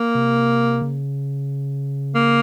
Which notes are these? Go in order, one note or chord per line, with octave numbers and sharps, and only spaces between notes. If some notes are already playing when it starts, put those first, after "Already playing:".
Already playing: A#3
C3
C#3
A#3